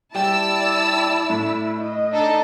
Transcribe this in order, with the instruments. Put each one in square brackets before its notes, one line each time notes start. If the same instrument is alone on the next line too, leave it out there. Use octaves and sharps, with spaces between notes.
[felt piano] G3 G5 [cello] E4 [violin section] D5 A5 E6
[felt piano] A2
[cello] D#5
[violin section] D4 D#4 A4